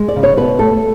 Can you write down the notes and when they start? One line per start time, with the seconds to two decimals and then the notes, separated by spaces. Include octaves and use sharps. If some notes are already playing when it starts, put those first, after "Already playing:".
Already playing: G#3
0.08 D5
0.16 C#3
0.23 C#5
0.37 B2 B4
0.59 A3 A4